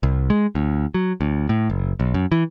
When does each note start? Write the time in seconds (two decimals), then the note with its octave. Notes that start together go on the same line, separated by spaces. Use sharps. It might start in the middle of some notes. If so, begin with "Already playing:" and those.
0.03 C2
0.30 G#3
0.55 D2
0.94 F#3
1.21 D2
1.49 A2
1.70 F#1
2.00 B1
2.14 F#2
2.32 E3